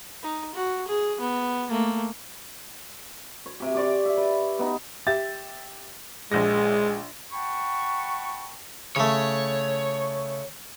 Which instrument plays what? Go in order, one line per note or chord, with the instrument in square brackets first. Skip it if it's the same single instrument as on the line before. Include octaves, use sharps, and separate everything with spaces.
[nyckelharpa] D#4
F#4
G#4
B3
A3 A#3
[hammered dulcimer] C#5
C3 G4
C#5 D5 D6
E5
B4
B3 D#4
[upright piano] G4 E5 A6
[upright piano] A#1 A#6 [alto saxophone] G#3
[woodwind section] F#5 G5 A5 B5 C#6
[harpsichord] C#3 A3 [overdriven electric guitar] C#5